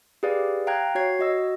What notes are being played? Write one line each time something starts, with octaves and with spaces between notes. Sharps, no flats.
G4 G#4 B4 D5 F5
F5 G5 A#5 F#6 G#6
F#4 C#5 G#6 C7
F#4 D#5 E6